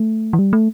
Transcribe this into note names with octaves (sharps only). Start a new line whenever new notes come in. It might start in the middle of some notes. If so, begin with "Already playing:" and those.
Already playing: A3
E3
G3
A3